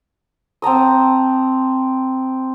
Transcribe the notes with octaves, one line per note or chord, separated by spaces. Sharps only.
C4 A5 A#5 D#6